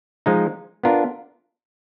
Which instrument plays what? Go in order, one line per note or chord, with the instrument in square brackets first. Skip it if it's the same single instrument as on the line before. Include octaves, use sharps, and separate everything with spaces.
[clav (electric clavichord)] F3 G#3 D#4
B3 D4 F4 A#4